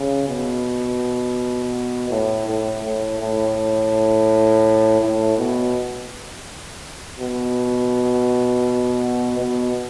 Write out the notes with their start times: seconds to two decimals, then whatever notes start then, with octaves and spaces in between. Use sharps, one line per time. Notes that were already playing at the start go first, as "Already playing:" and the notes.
Already playing: C#3
0.28 B2
2.10 A2
2.46 A2
2.82 A2
3.19 A2
5.01 A2
5.38 B2
7.20 B2
9.38 B2